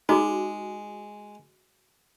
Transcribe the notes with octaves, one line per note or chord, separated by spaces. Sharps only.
G#3 D#4 F#4 G#4